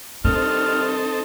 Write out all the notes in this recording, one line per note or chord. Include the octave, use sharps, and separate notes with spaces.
C3 D#3 G3 C4 D4 D#4 A4 F6